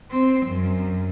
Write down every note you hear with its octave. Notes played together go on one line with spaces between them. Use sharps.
C4
F#2